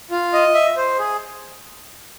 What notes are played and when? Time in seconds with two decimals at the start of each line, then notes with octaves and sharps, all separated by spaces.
0.11 F4
0.33 D#5
0.54 E5
0.77 C5
0.99 G#4